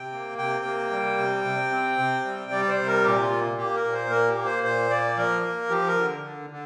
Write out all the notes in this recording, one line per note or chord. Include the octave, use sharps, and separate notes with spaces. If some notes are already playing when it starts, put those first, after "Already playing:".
Already playing: C3 G5
A#3
C3 G5
A#3
G3
C3
C3
C4
C3
G3
G3 D5
C5
C3
A#4
A#2 G4
F4
A#3
A#3 G4
A#4
A#2
C5
A#3 A#4
G4
A#3
C5
A#2 C5
A#3 D5
F3 A#4
A#3
F3 G4
A#4
D3
D3
D3